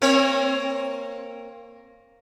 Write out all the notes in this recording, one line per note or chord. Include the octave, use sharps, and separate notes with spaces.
A#3 C4 C#5